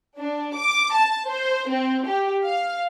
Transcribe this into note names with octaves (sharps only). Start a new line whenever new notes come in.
D4
D6
A5
C5
C4
G4
F5